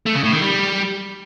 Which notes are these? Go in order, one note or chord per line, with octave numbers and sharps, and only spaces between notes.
A3
C#3
A2
D#3
G3